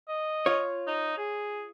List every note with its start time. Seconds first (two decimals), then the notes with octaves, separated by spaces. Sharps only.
0.09 D#5
0.46 F4 C#5
0.87 D#4
1.18 G#4